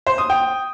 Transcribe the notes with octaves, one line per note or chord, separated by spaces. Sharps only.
C5
D#6
G5